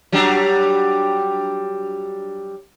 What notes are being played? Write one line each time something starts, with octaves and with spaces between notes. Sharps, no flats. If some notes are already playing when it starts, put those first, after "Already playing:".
F#3 G3 D4